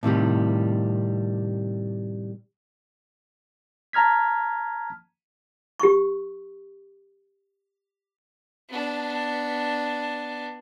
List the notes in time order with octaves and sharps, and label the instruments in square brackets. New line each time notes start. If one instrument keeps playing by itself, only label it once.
[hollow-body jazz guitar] A2 C3 D#3 G3
[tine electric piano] A5 A#5 F6 G#6 B6
[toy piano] G4 C#6
[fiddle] B3 D4